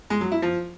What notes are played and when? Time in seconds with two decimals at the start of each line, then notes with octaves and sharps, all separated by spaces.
0.10 G#3
0.21 F#3
0.32 E4
0.42 F3